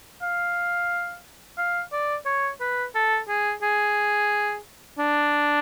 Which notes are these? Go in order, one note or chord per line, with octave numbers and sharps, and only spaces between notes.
F5
F5
D5
C#5
B4
A4
G#4
G#4
D4